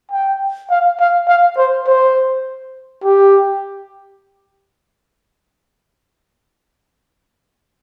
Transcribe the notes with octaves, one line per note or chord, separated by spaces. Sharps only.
G5
F5
F5
F5
C5
C5
G4